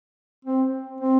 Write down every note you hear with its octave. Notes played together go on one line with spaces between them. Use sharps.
C4
C4